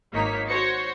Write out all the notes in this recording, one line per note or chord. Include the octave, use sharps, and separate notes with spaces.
G#1 A#3 D#4 C#5 B6
F#4 C5 C#5 C#6 A#6 C#7